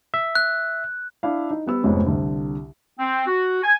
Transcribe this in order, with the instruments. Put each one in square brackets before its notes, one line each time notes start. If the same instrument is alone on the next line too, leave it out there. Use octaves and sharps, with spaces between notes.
[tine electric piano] E5
[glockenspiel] F#6
[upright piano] D4 E4 F5
D#4
G3 B3 E6
F1 F2 G#2 G#3 B3 C#4
C2 D3
[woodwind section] C4
F#4
G#5